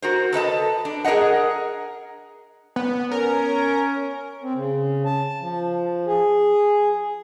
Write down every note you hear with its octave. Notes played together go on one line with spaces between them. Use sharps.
F#4 A#4 C5
A4 B4 D#5 A5
D4
G#4 A#4 C5 D#5 F#5
B3
C#4 A#4
C4
C#3
A5
F3
G#4